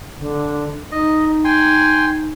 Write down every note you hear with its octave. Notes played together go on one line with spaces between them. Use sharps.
D3
D#4 D#5
G5 G#5 C6